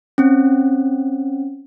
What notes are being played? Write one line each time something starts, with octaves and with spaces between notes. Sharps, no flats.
C4 C#4